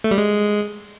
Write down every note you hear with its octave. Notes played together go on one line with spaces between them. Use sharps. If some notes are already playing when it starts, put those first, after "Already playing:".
A3
G3
G#3